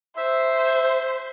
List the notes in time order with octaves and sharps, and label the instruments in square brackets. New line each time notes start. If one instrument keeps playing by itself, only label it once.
[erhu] C5 [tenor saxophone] E5